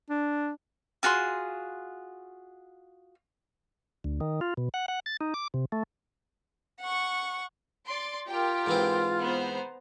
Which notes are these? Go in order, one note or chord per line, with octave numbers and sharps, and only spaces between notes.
D4
F4 F#4 G#4 C6
D2
D#3
F4
B2
F#5
F#5
A6
D#4
D6
C3
A3
F#5 C#6
D5 C6 D7
F4 G4 A#4 G5
G#2 E3 C4
B3 C5 A#5